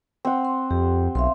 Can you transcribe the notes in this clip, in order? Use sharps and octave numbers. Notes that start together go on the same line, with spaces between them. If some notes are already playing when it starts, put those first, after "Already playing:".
C4 F#5
C6
F2 G4
B1 E5 F5 C6